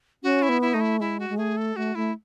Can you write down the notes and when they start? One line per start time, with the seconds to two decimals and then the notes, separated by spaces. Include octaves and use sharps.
0.23 C#4 F#4
0.42 E4
0.49 B3
0.62 E4
0.74 A3 D#4
0.81 E4
1.00 G#3 E4
1.20 F#4
1.29 G#3
1.38 A3 G#4
1.57 A4
1.76 A3 F#4
1.95 A3 E4